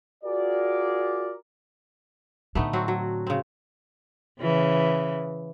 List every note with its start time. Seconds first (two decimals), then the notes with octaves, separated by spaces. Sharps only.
0.24 F4 F#4 G#4 A#4 D5
2.55 A2 D3 A3 B3 D#4
2.73 F#3 C4 F#4
2.88 F#3
3.27 C#3 C4
4.40 C#3 E3